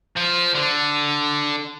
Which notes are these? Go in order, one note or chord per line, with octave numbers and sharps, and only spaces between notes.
F3
D3